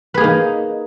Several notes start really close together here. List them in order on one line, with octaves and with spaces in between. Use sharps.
B4 G#4 A#3 D#4